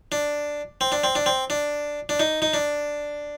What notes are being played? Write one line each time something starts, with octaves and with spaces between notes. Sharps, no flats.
D4
C4
D4
C4
D4
C4
D4
D4
D#4
D#4
D4